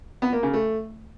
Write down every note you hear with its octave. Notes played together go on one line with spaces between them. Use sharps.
B3
A#3
C#3
A3